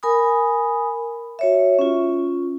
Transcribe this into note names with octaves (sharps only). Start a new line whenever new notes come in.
A#4 G#5 B5 D#6
F#4 C#5 E5
C#4 F4